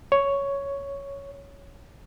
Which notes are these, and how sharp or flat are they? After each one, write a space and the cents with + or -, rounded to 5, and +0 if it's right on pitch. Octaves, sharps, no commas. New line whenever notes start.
C#5 +5